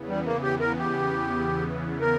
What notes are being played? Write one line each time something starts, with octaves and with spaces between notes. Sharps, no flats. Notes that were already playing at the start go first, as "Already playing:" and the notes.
Already playing: E2 C#3 E3 B3
G3
A#3
G4
A#4
G4
A#4